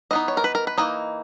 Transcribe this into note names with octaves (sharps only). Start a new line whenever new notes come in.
E3 B3 D#4 D#5
C#5
A#4
B4
A#4
B4
E3 A#3 D#4 D#5